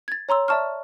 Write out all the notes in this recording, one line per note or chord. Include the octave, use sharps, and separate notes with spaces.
G#6 A6
C#5 A#5 C6 E6
D5 E5 A5 C#6 F6